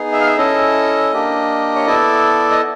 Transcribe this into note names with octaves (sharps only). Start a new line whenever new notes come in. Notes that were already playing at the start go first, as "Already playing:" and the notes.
Already playing: B3 D#4 G#4
E5
F5
E5
C#4 E4 A4 D#5
A#3 D4 G4
C#5
B3 E4 A4 D5
D#5